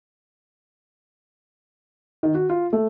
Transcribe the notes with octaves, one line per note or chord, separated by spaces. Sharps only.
D#3
F#4
F4
A3